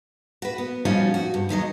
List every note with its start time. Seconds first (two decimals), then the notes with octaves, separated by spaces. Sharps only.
0.42 F#4 B4
0.58 B3
0.85 F3 G3 C#4 D#4 F4 F#4
1.14 F#4
1.34 G2
1.49 E2 D#3 F#3 D#5